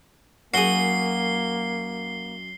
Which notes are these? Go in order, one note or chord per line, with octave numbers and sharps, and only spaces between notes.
F#2 A#3 F#4 G#4 C7 G7